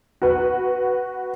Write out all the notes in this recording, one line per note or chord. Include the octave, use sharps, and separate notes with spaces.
F#4 B4